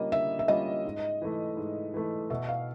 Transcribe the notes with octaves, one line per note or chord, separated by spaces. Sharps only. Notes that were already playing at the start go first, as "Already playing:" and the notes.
Already playing: D3 G3 A#3 C#4 F4 D#5
D3 E5
E5
G3 A#3 C#4 F4 D#5
G#2
E3 A3
G#2
E3 A3
B2 E5
F5